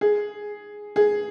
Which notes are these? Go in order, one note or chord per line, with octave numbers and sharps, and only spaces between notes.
G#4
G#4